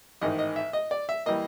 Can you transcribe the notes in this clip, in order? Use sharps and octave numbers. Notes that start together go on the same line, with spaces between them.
A1 G#2 D#3 D#5
D#5
E5
D#5
D5
E5
E3 G3 A#3 D#5